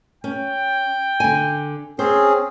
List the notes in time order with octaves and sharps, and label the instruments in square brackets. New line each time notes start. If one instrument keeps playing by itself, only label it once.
[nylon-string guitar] C#4 [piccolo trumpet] G5
[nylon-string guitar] D3 G#5
[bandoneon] C4 C#4 G#4 [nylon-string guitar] C5